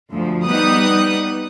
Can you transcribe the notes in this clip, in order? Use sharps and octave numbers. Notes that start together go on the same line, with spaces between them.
D2 F3
G3 B3 D#4 D#6 F#6